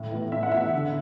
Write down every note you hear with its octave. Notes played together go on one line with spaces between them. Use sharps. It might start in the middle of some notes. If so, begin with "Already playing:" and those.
Already playing: A2
E3 B3
A2 E5
F#5
E3 B3 E5
D3